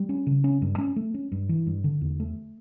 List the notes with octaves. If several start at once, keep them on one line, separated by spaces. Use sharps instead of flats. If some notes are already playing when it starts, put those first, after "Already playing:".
Already playing: G3
C#4
C#3
C#4
G2
C#4
A3
C#4
G2
E3
G2
D3
E2
A3